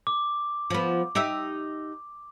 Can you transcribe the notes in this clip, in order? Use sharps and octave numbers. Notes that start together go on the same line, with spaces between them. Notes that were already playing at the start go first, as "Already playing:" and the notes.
D6
F3 B3
D#4 G4 E5